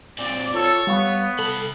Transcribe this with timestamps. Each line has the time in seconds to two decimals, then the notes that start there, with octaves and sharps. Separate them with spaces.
0.19 A#2 C4 D5
0.54 F4 A4 C#5
0.87 G3 B3 F5 C#6
1.39 C3 A4 B5